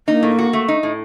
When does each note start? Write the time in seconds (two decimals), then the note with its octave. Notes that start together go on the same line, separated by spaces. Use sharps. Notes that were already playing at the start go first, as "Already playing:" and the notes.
0.08 A#3 D#4
0.23 A2
0.39 F#4
0.53 A3
0.68 D#4
0.83 A2